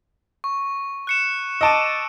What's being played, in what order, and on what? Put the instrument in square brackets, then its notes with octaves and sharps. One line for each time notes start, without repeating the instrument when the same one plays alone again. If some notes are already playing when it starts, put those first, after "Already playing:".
[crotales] C#6
F#6 C#7 E7
[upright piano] D#5 A5 D6 [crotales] E6 D7 D#7